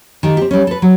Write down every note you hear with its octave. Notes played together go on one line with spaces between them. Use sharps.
D#3 G4 A4
C4 G4
G3 C#4
A4 B4
F#3